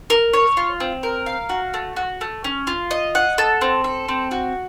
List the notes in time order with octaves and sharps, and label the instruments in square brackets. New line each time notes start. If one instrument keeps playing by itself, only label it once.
[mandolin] A#4
C#5
F4
C4
A#4
F5
F#4
A3
F#4
A3
C#4
F4
D#5
F#5
A4
C4
A4
C4
F#4